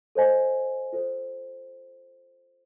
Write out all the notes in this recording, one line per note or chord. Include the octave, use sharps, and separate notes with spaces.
A4 C5 D#5 G#5
F4 A4 C5